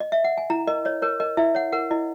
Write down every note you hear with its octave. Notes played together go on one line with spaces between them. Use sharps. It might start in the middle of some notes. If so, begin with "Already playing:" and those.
D#5
E5
F#5
G#5
E4 A#5
A#4 D#5
C#5 D#5
A#4 C#5
A#4 D#5
E4 E5
C#5 F#5
A#4 F#5
E4 D#5